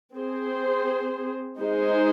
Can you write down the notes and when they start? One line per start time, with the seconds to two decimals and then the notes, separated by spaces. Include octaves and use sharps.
0.14 C4 G#4 C5
1.59 G#3 D#4 G#4 C5